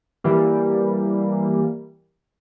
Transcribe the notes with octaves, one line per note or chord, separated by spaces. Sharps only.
E3 G3 A#3